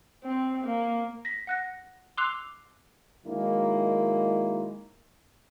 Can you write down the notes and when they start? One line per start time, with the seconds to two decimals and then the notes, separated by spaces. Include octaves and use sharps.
0.24 C4
0.64 A#3
1.25 A#6 B6
1.47 F#5 F#6 A#6
2.17 C6 D6 E6 F#6 C7 F7
3.26 D#3 F#3 G#3 A#3 E4